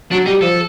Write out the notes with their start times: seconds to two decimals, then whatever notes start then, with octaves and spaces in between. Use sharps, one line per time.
0.11 F#3 D4
0.26 G3 D#4
0.41 F3 A4